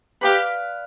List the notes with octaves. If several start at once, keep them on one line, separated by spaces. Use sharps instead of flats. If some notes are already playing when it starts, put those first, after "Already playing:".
G4 B4 D5 F5 B5